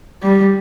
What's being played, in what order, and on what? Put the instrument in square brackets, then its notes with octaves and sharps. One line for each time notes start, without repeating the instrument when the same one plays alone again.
[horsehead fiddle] G3